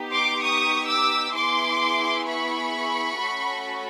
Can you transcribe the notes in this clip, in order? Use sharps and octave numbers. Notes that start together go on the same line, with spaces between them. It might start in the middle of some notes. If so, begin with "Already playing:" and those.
Already playing: B3 D#4 G4
C6 D6
C#6 D#6
D6 E6
B3 E4 G#4 C6 D6
B5 C#6
A3 C#4 F#4 A4